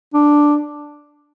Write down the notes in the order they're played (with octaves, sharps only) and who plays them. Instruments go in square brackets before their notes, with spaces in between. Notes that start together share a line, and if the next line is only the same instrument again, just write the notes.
[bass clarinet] D4